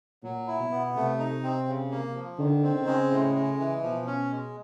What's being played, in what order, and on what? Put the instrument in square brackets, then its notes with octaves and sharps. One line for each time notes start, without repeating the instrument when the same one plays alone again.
[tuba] A#2 [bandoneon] F#3
[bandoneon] E4
[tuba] B2
[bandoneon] B3
[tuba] C3 [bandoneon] A3
[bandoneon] D#4
C4
C#3
A#3
F3
[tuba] D3 [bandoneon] D#3
[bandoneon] C4
[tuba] C#3
[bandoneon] G#3
A2
G#3
E3
[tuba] B2 [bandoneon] F3
[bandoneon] C#4
G#3